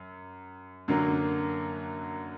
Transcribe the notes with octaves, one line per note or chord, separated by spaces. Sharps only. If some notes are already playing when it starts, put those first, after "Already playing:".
Already playing: F#2
F#2 D3 F#3 A#3